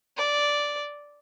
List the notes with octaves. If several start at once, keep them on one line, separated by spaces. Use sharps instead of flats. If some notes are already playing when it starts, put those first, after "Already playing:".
D5